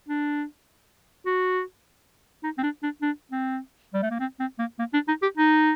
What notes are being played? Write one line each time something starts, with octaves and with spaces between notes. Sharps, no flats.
D4
F#4
D#4
C4
D4
D4
D4
C4
G3
A3
A#3
C4
C4
A#3
A#3
D4
D#4
G4
D#4